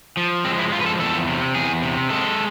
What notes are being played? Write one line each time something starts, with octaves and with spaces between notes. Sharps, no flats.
F3
G#3 C4
E4
F3 F4
B4
A4
E2 A4
C3
E2 G#4
C3
G#3 A4